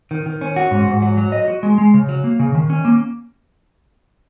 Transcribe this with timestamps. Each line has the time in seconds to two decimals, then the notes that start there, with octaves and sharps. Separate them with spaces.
0.11 D#3
0.26 D#3
0.41 C#4
0.56 F#4
0.71 G#2
0.87 G#2
1.02 F#3
1.17 F#3
1.32 D#5
1.48 F#4
1.63 G#3
1.78 G#3
1.94 C#3
2.09 F#3
2.24 A#3
2.39 C#3
2.55 D#3
2.70 C#4
2.85 A#3